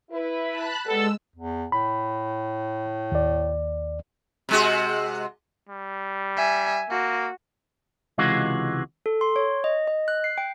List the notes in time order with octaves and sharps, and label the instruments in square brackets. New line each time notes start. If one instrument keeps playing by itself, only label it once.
[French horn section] E4 B4
[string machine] A5 B5 F#6
[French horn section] G3 B3 A4 [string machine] G#3 E6
[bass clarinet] E2
[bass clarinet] A2 [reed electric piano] B5
[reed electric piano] D#2 D5
[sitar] C3 G#3 F#4
[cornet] G3
[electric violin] E5 G#5
[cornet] A#3 [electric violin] F#4
[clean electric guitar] C#2 C3 E3 G#3 F4 F#4
[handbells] A4
C6
C#5
D#5
D#5
F#6
C7
G5